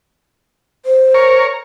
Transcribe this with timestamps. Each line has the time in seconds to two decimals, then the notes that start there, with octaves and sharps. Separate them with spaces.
0.85 C5
1.14 A#4 C#5